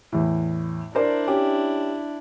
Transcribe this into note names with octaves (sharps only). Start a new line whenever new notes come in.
E2 A2
D4 E4 A#4 C5 D5
C#4 G4